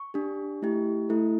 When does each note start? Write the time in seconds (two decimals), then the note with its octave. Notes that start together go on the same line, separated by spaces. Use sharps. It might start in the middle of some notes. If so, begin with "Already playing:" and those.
Already playing: C#6
0.14 D4 G4
0.62 A3 E4 G4
1.09 A3 E4 A4